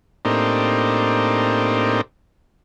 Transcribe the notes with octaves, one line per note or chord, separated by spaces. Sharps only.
A2 A#3 C4 D4 D#4 G4